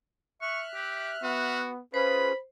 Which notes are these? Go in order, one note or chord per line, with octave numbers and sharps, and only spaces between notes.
E5 C#6 F6 F#6
G4
B3 F#4
C#4 F4 G#4 B4 C5 B5